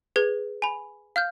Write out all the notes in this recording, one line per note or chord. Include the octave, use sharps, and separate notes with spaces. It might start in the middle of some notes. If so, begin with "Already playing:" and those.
G#4 B4 G#6
G#5 B5
F5 F6 G6